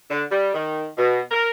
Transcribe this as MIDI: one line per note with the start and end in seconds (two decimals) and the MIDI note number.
0.11 0.23 50
0.31 0.54 55
0.54 0.87 51
0.98 1.21 47
1.31 1.51 70